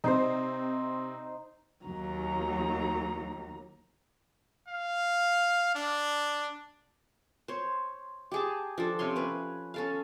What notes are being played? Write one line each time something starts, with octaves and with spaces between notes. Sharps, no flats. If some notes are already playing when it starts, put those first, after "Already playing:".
C3 C4 D#4 C5 C7
D#2 F#3 A#5
F5
D4
C5 C#5
G4 G#4 A5
F3 D4 A4
C3 C#4 C#5 C6
C#4 B4
C#4 A4 F5